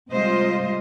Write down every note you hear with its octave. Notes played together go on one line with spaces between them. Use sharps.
C3 G3 G#3 F4 C5 D#5